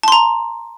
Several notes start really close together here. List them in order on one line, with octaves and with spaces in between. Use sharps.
A5 C6 A#5